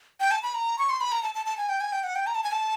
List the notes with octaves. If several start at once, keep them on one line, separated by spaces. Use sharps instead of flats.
G5
A5
B5
A#5
C#6
C6
B5
A#5
A5
A5
A5
G#5
G5
G#5
G5
F#5
G5
A#5
A5
G#5
A5